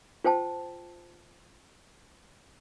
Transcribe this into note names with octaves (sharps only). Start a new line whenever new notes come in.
F4 C5 G5 A5